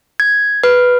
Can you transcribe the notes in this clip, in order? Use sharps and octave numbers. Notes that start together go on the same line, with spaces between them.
G#6
B4